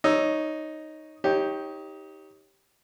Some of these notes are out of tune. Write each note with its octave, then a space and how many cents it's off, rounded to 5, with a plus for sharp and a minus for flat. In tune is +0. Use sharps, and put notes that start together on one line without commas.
D#4 +0 C#5 +0 E6 +0
D#4 +20 G4 +0 C#5 -10